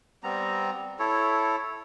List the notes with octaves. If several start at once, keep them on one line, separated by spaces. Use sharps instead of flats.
G3 B3 C4 A#5
E4 A4 C#5